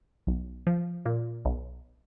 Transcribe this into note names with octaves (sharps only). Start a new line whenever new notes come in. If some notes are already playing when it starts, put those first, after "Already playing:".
B1
F3
A#2
B1